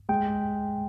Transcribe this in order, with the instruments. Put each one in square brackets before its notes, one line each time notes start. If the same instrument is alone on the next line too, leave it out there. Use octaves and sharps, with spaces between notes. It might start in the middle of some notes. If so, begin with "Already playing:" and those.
[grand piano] G#3 [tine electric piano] G5